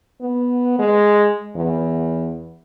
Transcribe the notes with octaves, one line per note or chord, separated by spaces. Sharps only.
B3
G#3
E2